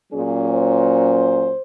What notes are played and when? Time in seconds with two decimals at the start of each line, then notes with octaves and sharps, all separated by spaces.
0.13 A#2 F#3 C#4 G#4
0.47 C5